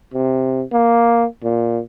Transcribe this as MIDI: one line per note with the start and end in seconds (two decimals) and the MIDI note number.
0.14 0.63 48
0.72 1.25 58
1.43 1.80 46